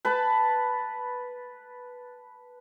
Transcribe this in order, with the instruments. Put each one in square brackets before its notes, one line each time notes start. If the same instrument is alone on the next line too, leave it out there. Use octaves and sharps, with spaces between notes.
[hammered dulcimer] B4 A5